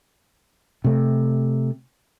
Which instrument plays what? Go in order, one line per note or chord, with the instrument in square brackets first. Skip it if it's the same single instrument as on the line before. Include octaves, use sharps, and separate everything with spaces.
[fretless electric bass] C3 A3